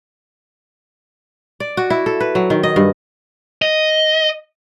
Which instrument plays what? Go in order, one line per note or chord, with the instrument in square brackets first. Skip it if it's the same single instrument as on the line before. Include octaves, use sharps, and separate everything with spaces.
[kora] D5
F#4
E4
A4
B4
F#3
D#3
D#5
G2
[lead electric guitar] D#5